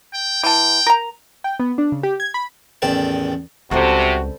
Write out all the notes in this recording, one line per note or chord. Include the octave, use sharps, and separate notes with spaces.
G5
E3 G5 A5
A#4 A#5
G5
B3
D4
C#3
G4
G#6
B5
A1 E2 D#3 D5 G5 A5
C#2 C3 G3 C4 F#4 A4